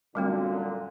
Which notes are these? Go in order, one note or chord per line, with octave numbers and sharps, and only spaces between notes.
F#2 A#2 D3 G3 A3 C4